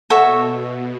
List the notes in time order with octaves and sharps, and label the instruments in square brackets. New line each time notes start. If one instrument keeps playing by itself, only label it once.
[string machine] B2 [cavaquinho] F#4 A4 C#5 E5